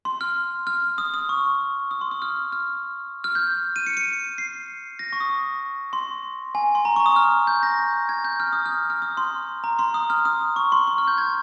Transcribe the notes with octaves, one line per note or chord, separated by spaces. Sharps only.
C6
F6
F6
D#6
D#6
C#6
D#6
C6
D#6
F6
F6
F6
G6
D#7
C#7
C#7
C7
A#6
C#6
D#6
C6
G#5
C6
A#5
C#6
D#6
F6
G6
A#6
G#6
G6
F6
D#6
F6
F6
D#6
C6
A#5
C6
D#6
F6
D#6
C#6
C6
C#6
F6
G6
G#6